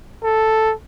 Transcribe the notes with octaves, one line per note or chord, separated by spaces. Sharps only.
A4